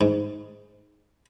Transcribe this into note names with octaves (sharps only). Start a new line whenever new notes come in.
G#2